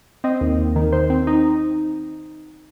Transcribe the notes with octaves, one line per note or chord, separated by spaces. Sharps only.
C4 D#5
D#2
D#2
D#3
D#3 C5
C4
D#4